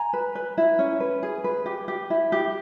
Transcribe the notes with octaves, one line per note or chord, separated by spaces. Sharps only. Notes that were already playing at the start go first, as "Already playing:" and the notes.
Already playing: G#5 A#5
B4
B4
E4
C#4
B4
G#4
B4
G4
G4
E4
G4